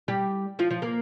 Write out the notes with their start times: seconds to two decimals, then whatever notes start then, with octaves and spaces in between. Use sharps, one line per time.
0.08 G3 G4
0.59 F3 F4
0.70 F3 F4
0.82 A#3 A#4